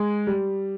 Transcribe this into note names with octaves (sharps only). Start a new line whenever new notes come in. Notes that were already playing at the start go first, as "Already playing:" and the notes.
Already playing: G#3
G3